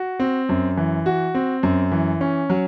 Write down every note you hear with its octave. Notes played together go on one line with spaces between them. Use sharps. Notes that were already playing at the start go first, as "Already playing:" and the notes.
Already playing: F#4
C4
F#2
E3
F#4
C4
F#2
E3
C#4
F#3